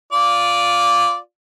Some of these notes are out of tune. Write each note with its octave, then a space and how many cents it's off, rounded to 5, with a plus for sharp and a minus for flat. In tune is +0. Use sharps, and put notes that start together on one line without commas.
F4 +0 D5 -10